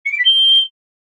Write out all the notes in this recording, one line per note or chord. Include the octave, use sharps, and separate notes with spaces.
C#7
D7
B6
G7